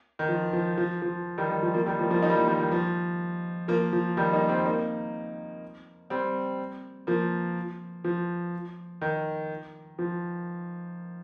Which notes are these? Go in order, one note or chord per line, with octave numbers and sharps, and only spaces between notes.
D#3
F3
F3
F3
F3
D#3 G3
D#3
F3
F3 A#3
D#3 G3
F3 A#3
F3 A#3
A#3 D#4
G3
F3 A#3
D#3 G3
D#3
F3
F3 A#3
F3
D#3 G3
A#3 D#4
G3 C4
A#3 D#4
G3 C4
F3 A#3
F3
D#3
F3